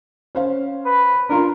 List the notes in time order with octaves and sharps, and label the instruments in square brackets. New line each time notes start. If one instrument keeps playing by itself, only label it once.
[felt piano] C#4 C5 F5
[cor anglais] B4
[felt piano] D4 F4 C6 [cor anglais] A#4